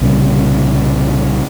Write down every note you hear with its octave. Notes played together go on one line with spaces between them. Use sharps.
C2 A#2 C#3 G3